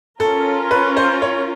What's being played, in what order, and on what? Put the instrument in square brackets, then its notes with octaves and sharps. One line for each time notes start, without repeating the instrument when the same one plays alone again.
[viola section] C#4 F4 A#4 [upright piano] A4
[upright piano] B4
C5
C#5